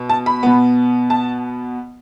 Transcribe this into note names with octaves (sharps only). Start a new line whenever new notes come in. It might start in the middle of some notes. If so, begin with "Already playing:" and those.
Already playing: B2
A5
B5
B2 B3
A5